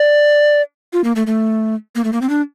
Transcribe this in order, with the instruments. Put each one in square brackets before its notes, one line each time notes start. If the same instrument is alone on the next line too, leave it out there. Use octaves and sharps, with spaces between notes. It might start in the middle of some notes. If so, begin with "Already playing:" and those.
Already playing: [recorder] D5
F4
A#3
A3
A3
A#3
A3
A#3
C4
D4